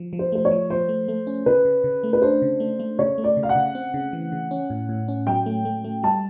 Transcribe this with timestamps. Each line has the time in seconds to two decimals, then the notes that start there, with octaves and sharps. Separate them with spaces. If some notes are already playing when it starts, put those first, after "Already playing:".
Already playing: F3
0.13 F3
0.19 C5
0.32 A3 C5
0.45 C#5
0.51 F3
0.70 F3 C5
0.89 A3
1.08 A3
1.27 C#4
1.46 C#3 B4
1.65 C#3
1.84 C#3
2.03 A3
2.13 B4
2.22 D4 C5
2.42 C#3
2.60 A3
2.79 A3
2.99 C#3 C#5
3.18 A3
3.24 D5
3.37 C#3
3.43 F5
3.49 F#5
3.55 C#3
3.75 C4
3.94 C#3
4.13 E3
4.32 C#3
4.51 C#4
4.70 A2
4.89 A2
5.08 C#4
5.27 F#3 G5
5.46 A3
5.65 A3
5.84 A3
6.03 G3 A5